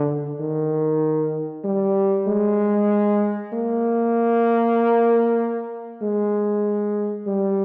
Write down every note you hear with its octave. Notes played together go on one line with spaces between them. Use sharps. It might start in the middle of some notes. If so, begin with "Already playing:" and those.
Already playing: D3
D#3
G3
G#3
A#3
G#3
G3